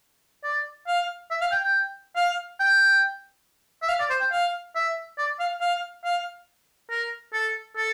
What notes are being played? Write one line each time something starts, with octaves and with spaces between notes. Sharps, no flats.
D5
F5
E5
F5
G5
G5
F5
G5
E5
F5
D5
C5
G5
F5
E5
D5
F5
F5
F5
A#4
A4
A4